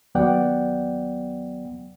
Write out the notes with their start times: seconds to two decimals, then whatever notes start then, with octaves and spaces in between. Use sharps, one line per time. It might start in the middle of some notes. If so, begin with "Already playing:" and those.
0.15 D#2 F#3 B3 D5 F#5 G5